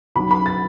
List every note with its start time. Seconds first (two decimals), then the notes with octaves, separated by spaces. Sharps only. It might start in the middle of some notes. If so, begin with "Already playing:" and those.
0.15 B1 B2 F#3 B5
0.31 B5
0.46 A6